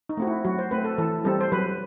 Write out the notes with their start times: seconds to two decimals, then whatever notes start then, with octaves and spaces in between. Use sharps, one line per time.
0.09 D#4
0.17 A3 C4 F#4
0.27 E4
0.45 F#3 F#4
0.59 C5
0.71 A3 C4 B4
0.84 A4
0.98 E3 A4
1.24 G3 C4 A4
1.41 C5
1.52 F#3 B4